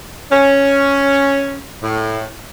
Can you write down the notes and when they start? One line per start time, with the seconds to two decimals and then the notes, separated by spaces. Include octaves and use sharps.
0.30 C#4
1.82 A2